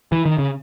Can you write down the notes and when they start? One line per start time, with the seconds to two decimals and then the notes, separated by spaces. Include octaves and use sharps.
0.12 E3
0.26 D#3
0.38 C#3